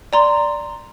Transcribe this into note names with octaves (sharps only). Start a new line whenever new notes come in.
D5 A#5 C6